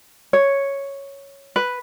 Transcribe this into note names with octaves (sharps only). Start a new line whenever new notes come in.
C#5
B4